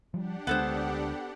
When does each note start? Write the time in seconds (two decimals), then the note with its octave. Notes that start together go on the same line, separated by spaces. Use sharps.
0.14 F3 G3 D4 G4 F#5
0.47 D2 G#3 B3 A4 C5